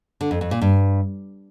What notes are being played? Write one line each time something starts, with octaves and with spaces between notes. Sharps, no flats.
D3
F2
F2
A#2
G2